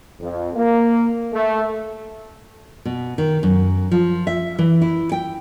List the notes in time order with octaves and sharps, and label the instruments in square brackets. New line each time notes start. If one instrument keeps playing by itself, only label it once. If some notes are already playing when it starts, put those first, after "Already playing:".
[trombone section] F2
A#3
A3
[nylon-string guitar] B2
D#3
F#2
F3
E5
E3
E4
G5